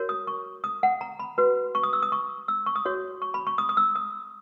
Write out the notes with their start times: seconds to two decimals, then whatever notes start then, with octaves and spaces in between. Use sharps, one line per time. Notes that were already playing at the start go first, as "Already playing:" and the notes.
Already playing: F#4 A#4 C#5
0.09 D#6
0.27 C#6
0.64 D#6
0.83 F#5
1.01 A#5
1.19 B5
1.38 F#4 B4
1.75 C#6
1.83 D#6
1.93 E6
2.03 D#6
2.12 C#6
2.48 E6
2.66 C#6
2.76 D#6
2.85 F#4 C#5
3.22 C#6
3.34 B5
3.47 C#6
3.58 D#6
3.69 D#6
3.77 E6
3.96 D#6